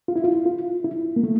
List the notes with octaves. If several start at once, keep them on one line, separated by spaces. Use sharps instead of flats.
F4
E4
F4
F4
E4
A#3
A3